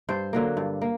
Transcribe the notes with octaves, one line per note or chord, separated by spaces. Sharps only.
G2 C5
D3 F#3 A#3
G2
A#3